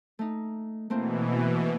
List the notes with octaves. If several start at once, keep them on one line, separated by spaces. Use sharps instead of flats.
A3 D#4
B2 E3 A3 A#3 C4